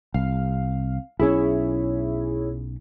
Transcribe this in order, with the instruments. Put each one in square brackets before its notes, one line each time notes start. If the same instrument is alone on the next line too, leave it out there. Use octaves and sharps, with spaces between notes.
[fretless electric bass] C2 [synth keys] F5
[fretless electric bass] B1 C#4 [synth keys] E4 G#4 C#5